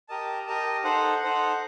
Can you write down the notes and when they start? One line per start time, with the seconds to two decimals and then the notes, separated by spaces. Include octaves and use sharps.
0.09 G4 A#4 D#5 A5
0.46 G4 A#4 D#5 A5
0.84 D#4 A4 C5 F#5
1.22 D#4 A4 C5 F#5